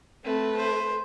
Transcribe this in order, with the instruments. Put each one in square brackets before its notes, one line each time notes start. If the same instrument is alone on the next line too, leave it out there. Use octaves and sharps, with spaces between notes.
[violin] A3 B4 [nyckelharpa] C4
[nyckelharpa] C5